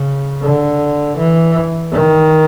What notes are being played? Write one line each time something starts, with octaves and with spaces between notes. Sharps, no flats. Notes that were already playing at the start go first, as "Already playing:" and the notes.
Already playing: C#3
D3
E3
D#3